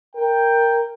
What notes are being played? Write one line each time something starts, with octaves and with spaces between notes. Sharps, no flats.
A#4 G5